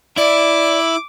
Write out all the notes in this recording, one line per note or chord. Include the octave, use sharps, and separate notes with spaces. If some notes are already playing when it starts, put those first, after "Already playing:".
E4 D5 D6